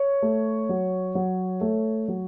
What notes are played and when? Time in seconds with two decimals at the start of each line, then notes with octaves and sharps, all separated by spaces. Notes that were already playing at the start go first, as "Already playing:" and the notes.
Already playing: C#5
0.22 A3
0.69 F#3
1.15 F#3
1.61 A3
2.08 F#3